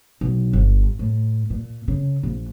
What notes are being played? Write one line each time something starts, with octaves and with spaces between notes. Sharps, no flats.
B1
G1
A2
A#2
C#3
A#1